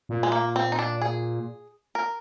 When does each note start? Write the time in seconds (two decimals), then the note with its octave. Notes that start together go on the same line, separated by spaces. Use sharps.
0.09 A#2
0.23 G#3
0.32 A#3
0.56 C4
0.72 D#4
0.79 D4
1.01 G#4
1.95 A#4